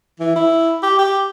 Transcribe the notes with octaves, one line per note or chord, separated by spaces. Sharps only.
E3
E4
G4
G4